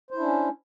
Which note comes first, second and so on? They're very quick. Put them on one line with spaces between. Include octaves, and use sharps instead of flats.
C5 E4 D4 C#4